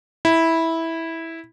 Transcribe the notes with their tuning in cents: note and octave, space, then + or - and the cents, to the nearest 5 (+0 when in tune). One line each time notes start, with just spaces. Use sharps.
E4 -10